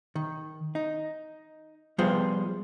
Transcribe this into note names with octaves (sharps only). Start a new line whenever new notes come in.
D#3
D#4
F3 G3 B3 F4 G#4 C5